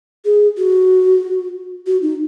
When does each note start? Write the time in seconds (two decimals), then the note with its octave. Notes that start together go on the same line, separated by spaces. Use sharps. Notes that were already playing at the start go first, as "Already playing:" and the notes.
0.25 G#4
0.58 F#4
1.87 F#4
2.02 D#4